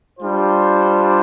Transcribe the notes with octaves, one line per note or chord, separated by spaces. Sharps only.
G3 D4 F4 C5